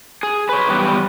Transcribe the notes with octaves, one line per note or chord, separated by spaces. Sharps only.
G#4
B4 C#5
E2 G3 B3 G4 B4